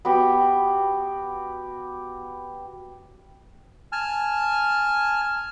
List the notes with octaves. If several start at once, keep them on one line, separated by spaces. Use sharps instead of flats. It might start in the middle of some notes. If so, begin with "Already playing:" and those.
B3 F#4 G4
G#5 A5 F6